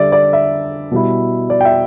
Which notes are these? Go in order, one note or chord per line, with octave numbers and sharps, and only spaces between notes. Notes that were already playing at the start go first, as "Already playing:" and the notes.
Already playing: D3 G3 D4 D5 E5
D5
E5
B2 G3 E4
D5
G5
E5